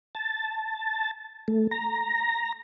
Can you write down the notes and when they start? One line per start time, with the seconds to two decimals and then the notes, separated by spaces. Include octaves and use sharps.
0.15 A5
1.48 A3
1.71 A#5